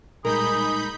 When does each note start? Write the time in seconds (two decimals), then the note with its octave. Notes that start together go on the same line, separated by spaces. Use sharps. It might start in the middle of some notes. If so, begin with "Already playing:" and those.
0.25 A#2 G3 G#3 D#4 G#4 A#4 B5 G6